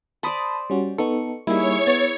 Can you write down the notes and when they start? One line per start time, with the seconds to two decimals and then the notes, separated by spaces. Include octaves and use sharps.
0.23 C5 D5 A5 B5 D#6
0.70 G3 C#4 F#4
0.98 B3 D#4 A4 C#6
1.47 G3 A#3 D#4 E4 G#4 C#5 C#6
1.87 B3 A6